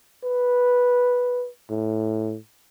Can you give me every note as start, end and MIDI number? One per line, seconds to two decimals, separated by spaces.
0.24 1.49 71
1.71 2.37 45